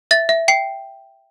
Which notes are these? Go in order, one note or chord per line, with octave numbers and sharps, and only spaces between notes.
E5 A6
E5
G5 C7